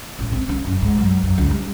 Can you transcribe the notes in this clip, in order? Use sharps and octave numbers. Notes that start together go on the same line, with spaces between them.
A1
C4
C#4
F#1
G#2
F#2
F#2
C#2
G3